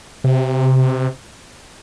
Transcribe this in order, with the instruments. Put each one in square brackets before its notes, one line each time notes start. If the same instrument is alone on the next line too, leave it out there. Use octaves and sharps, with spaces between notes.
[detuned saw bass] C3